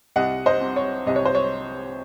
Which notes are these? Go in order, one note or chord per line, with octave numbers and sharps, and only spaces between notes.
C2 D#5 F#5
C5 D#5
C3
C#5
C2 D#5
C#5
C5
C#5